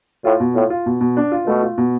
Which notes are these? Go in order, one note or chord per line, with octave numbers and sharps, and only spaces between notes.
A2 F4
B2
A2 F4
F4
B2
B2
D4
F4
B2 A3
F4
B2